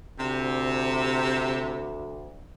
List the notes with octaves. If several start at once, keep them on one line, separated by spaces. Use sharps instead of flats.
D2 C3